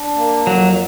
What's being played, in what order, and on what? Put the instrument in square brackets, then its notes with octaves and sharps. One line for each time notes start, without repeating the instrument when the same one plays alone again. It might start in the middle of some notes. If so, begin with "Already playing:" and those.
Already playing: [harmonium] D4
A#3
[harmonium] F2 [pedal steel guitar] F#3